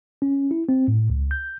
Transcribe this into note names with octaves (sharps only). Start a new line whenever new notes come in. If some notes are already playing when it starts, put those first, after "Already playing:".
C#4
E4
C4
A2
C#2
G6